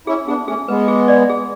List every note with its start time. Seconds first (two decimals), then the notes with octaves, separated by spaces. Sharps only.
0.07 C#4 E4 G#4
0.27 B3 D4 G#4
0.48 A3 C#4 G#4
0.68 G#3 B3 B4
0.88 G#4
1.08 D5
1.29 G#4